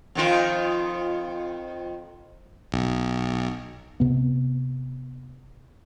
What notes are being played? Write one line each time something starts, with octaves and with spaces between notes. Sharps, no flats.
F2 D#3 F4
B1
C3 B3